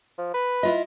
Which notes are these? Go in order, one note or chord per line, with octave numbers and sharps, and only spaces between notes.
F3
B4
E4 F4 D#5